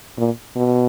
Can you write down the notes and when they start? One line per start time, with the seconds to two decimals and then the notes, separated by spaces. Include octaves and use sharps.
0.18 A#2
0.56 B2